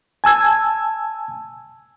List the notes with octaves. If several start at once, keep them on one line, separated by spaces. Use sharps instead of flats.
G#5 A5 E6 G#6